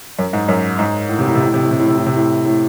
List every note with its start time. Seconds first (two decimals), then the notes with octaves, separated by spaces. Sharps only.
0.19 F#2
0.33 G#2
0.48 F#2
0.79 G#2
1.09 A2
1.19 C3
1.27 A2
1.35 C3
1.44 A2
1.54 C3
1.63 A2
1.71 C3
1.79 A2
1.88 C3
1.98 A2
2.06 C3
2.16 A2
2.45 A2